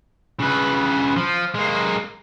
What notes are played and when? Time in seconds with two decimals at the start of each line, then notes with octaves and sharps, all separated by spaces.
0.40 C#3 B4
1.16 F3
1.55 G#3 A#3